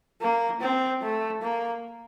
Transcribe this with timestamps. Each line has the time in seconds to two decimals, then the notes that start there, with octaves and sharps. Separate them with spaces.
0.21 A#3
0.61 C4
1.02 A3
1.42 A#3